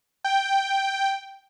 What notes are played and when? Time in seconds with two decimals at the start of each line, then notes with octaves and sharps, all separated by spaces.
0.24 G5